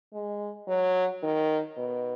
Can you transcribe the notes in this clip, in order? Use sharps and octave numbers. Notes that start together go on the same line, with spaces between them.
G#3
F#3
D#3
B2